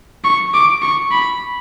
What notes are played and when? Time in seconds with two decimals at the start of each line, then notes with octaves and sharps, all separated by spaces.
0.24 C#6
0.54 D6
0.82 C#6
1.11 B5